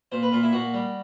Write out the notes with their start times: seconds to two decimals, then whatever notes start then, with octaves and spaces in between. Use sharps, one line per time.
0.12 A#2 C5
0.23 B4
0.32 A#2 F4
0.43 E4
0.52 A#2 F#4
0.74 G3